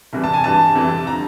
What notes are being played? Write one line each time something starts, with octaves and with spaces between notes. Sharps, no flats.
C2 C3 E3 G3
A5
G#5
G2 E3 G3 A5
F2 C3 E3 G3
D3 F3 A#5